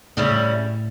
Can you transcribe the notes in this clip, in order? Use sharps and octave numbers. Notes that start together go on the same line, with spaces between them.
A2 C#3 G3 C#4 E4